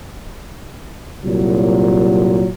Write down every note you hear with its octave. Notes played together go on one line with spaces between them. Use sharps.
C2 A#2 F#3